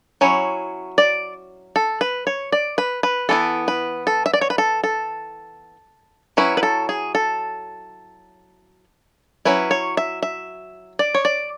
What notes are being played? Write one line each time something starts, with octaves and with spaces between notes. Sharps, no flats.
F#3 C#4 E4 C#5
D5
A4
B4
C#5
D5
B4
B4
E3 B3 E4 A4
B4
A4
E5
D5
C#5
B4
A4
A4
F#3 C#4 E4 B4
B4
A4
G#4
A4
F#3 C#4 E4 B4
C#5
E5
E5
D5
C#5
D5